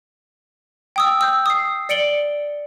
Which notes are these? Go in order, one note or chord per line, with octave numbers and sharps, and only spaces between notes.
G5 D#6 E6
E6 G6
D#6 C7
D5 C#7 D7 F#7 G7